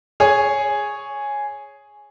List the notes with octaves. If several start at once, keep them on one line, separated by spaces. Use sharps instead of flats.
G#4 C#5 G#5